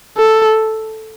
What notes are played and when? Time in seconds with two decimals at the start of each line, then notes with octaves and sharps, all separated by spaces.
0.17 A4